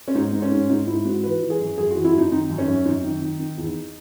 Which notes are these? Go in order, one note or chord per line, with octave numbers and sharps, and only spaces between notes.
C#4
G#2 D#4
G#2
C#4
G#2
G#2 D#4
G#2 E4
G#2 F#4
E3 B4
E3
G#4
F#2
F#2 G#4
E3 F#4
E4
F#2 D#4
D#3 D#4
F#2
C#4
F#2
F#2 D#4
D#3
D#3
D#3
E2